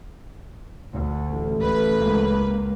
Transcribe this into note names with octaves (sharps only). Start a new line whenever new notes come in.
D2
A1 A3
D2 B4
C#2 A#3